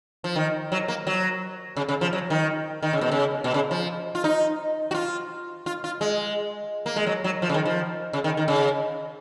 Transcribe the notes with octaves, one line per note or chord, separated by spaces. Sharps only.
F3
D#3
F#3
A#3
F#3
C#3
C#3
F3
F#3
D#3
D#3
C#3
B2
C#3
B2
C#3
F3
F4
D#4
F#4
F4
F4
F4
G#3
A#3
G#3
F#3
F#3
F3
C#3
D#3
F3
C#3
D#3
D#3
C#3